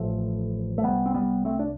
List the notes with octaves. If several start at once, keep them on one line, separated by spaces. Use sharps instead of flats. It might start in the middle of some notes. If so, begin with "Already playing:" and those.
Already playing: A1 A2 F3 A3
A3
C2 C3 G3 B3
C4
G3 B3
A3 C4
D4